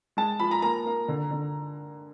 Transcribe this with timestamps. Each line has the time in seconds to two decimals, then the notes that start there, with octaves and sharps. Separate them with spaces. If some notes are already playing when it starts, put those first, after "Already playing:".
0.17 G#3 A5
0.40 F3 B5
0.51 A#5
0.62 A#3 A#5
0.86 A#3
1.08 D3
1.31 D3